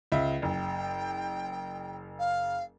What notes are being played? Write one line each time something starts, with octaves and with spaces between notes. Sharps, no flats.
C#2 E5
F#1 G5
F5